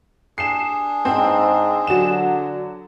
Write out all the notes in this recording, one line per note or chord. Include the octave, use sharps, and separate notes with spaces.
D4 G#4 C7 E7
G#2 C4
D3 F#3 E7